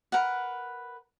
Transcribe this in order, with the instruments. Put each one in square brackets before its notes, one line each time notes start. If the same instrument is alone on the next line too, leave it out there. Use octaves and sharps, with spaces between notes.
[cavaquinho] A#4 B4 F#5